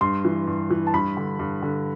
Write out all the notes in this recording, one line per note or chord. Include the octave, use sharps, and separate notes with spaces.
G2 C6
E3
G2
E3
A5
G2 B5
D3
G2
D3